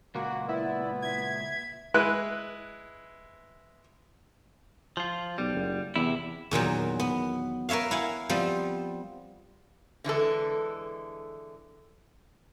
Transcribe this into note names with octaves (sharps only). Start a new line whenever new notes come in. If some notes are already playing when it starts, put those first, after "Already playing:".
C#2 A#2 A#3 F#4
B3 E4 D5
E5 G#6
G#3 E4 B4 F#6
F3 F4
B1 G3
F#1
E2 C3 E4
E2 A#2 D#3 F#3
B3
A#4 B4 C#5 E5 F5
E4 F5 F#5 G#5
F3 G3 B3 C4
D3 E3 G#3 A4